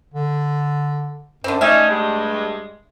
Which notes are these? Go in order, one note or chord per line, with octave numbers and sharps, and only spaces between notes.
D3
F#2 D3 C4
A3 C#4 D#4 D5 E5
G2 G#3